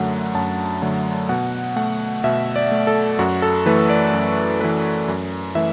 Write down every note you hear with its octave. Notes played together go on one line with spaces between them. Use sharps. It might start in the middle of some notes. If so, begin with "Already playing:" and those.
Already playing: F#2 D3 F#3 A3 F#5
F#2 A5
D3 F#3 A3
B2 F#5
A3 F#5
B2 E5
D5
A3
A4
F#2 F#4
A4
E3 A3 B4
D5
F#2
E3 A3 B4
F#2
E3 A3 E5